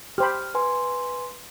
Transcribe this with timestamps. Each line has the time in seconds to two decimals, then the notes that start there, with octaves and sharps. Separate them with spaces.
0.18 G4 C5 B5 F6
0.55 B4 G#5 C6